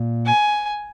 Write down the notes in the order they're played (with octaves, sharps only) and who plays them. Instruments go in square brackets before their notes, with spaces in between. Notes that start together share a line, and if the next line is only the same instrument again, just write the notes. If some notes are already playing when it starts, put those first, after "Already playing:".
Already playing: [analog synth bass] A#2
[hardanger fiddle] G#5